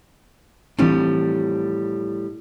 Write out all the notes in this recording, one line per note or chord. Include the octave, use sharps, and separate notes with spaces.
A2 E3 F3 G3 C4 D4